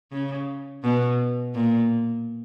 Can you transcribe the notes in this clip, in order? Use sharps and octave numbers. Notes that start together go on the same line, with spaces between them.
C#3
B2
A#2